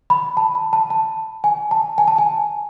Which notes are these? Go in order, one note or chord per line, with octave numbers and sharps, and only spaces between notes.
B5
A5
B5
A5
A5
G#5
A5
G#5
A5
G#5